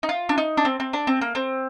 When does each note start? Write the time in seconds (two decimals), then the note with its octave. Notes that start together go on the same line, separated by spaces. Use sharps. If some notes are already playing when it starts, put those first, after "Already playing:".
0.03 D#4
0.09 F4
0.29 D4
0.38 D#4
0.57 D4
0.65 C4
0.80 C4
0.93 D4
1.07 C4
1.21 A#3
1.35 C4